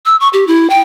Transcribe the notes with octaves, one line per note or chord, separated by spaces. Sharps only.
E6
C#6
G4
E4
G5